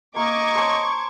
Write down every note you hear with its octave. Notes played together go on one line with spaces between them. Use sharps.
A#3 D#5 C#6 D6 G#6
C5 C#5 A5